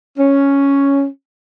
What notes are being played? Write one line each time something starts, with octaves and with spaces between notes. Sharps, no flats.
C#4